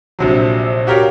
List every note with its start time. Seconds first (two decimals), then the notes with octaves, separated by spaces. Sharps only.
0.19 A#1 C3 F#3
0.87 F#4 G4 A#4 C#5 F5